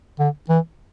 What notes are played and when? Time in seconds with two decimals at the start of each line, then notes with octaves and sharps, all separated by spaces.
0.19 D3
0.49 E3